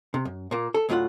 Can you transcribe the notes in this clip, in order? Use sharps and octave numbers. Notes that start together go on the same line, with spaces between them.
C3
F#2
A#2 A#3
A4
D2 A2 F#3 G#3 F4 F#5